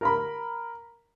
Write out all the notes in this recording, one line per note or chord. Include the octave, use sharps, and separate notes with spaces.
A#4 A#5 B5